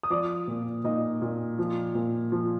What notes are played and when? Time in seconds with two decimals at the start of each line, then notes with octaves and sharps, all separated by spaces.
0.03 D#6
0.10 F3 D5 D6
0.48 A#2
0.84 A#2 D#4 D#5
1.22 A#2
1.59 F3
1.95 A#2
2.32 F3